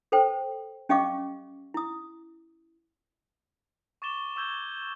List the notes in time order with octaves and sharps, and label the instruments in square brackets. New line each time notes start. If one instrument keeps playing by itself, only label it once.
[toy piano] A4 B4 C5 G5
C#4 G4 D#5 F5 C#6 D6
E4 D#6
[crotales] C#6 D6 A6 D#7 E7 G7
C#6 D6 E6 G6 G#6 G7